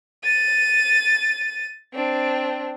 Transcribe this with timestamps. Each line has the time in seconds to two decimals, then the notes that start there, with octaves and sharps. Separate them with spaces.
0.24 A6 D#7
1.94 C4 D4